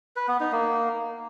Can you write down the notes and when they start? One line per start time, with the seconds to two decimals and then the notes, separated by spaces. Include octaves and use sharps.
0.16 B4
0.28 B3
0.40 D#4
0.52 A#3